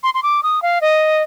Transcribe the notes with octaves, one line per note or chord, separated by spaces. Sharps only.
C6
C6
D6
D#6
F5
D#5